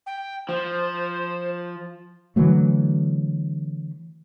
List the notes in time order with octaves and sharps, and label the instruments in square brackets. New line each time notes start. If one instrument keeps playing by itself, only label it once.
[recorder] G5
[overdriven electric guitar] F3 [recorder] C5
[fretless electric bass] D3 E3 F#3 A3